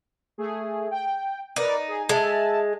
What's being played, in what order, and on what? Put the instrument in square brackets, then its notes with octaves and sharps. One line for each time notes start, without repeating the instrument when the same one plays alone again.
[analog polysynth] A3 G#4
G5
[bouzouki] D#4 [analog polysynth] A#4 B4 D5
[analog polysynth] G#4
[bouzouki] G#3 [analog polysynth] E5 A5